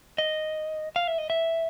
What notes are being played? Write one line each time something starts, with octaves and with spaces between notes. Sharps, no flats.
D#5
F5
E5
D#5
E5